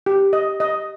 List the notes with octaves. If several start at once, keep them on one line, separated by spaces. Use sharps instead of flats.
G4
D#5
D#5